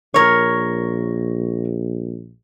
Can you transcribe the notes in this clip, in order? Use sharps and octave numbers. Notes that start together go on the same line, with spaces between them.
A#1 A#4 C#5